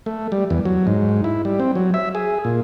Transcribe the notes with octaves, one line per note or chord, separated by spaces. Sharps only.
A3
G3
E2
F#3
G#2
E4
G3
C4
F#3
E5
G#4
A#2